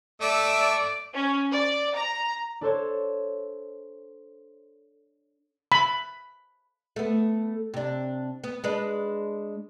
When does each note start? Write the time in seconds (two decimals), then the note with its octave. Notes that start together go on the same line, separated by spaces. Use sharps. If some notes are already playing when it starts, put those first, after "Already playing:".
0.21 A3 D5 E5
1.12 C#4
1.50 D5
1.94 A#5
2.61 D4 A4 C5 C#5
5.72 B5
6.96 A3 B3
7.74 C3 D4
8.44 B3
8.64 G#3 D4 B4